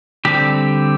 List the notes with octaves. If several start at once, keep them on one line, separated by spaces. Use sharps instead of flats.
D3 G3 C4 G4